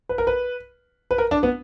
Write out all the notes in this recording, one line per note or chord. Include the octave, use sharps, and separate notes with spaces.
B4
A#4
B4
B4
A#4
D4
B3